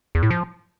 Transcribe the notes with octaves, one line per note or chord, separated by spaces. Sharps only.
E2
A2
F3